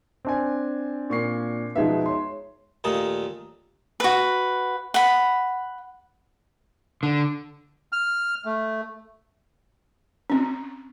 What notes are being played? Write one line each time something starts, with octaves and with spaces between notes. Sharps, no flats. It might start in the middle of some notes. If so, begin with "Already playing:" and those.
C4 D4 G#5
A#2 C#6 C7
B2 F3 G#3 B3 D#4 E5
C#5 C6
D#2 A#2 A3 D#6
F#4 B4
F#5 B5
D3
F6
A3
C4 C#4